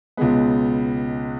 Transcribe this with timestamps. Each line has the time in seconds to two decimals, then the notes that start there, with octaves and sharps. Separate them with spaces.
0.17 C#2 B2 G#3 B3